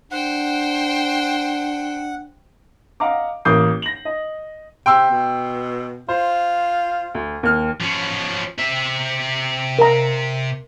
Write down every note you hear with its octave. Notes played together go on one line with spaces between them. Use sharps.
D4 C5 F#5 G5
D#5 F5 F#5 A#5 D6
A1 A#3 D6 D#6 G6 C7
A#6 F#7
D#5
C3 G5 C6 E6
B2
F4 C5
D2
D#2 F6
F3 C#4
C3 E5
A#4 A#5